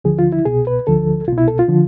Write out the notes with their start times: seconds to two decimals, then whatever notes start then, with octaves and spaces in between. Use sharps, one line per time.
0.04 D2 D3 F3 G#4
0.19 F4
0.32 E4
0.45 C2 B2 G#4
0.67 B4
0.87 D2 D3 F3 A4
1.28 C2 F4
1.32 B2
1.38 E4
1.48 A4
1.59 F4
1.68 D3 F3